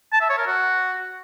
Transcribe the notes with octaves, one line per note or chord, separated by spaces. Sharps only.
A5
E5
C#5
A#4
F#4